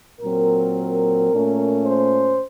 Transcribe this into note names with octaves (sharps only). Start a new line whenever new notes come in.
A#2 F#3 C4 A#4
A#2 A3 C#4
C5